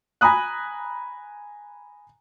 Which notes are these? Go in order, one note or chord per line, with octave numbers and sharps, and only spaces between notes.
G#5 A#5 B5 D#6 F#6